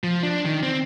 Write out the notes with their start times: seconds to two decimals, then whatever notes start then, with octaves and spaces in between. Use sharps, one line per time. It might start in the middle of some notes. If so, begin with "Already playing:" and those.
0.04 F3
0.23 D4
0.45 D#3
0.63 C4